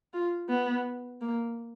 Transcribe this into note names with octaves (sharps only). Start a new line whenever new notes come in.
F4
B3
A#3